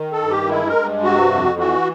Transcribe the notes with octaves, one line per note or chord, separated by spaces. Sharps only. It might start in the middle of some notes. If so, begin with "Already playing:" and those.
Already playing: D#3
A4
G2
G4
G#3 E4
A#4
G2
C3 F#4
F2
E3 F#4